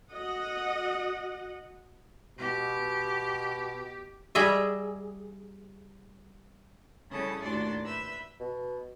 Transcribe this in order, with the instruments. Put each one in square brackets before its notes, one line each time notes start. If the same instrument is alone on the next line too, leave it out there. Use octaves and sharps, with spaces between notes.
[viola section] F#4 D#5 F#5
[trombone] B2 [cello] G4
[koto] G3 G#4 D#5 E5
[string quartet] C#3 G3 C#4 E4 A4 D#6
D#2 A2 D4 F#4 D5 C6
B4 E5 B5 E6 G6
[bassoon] B2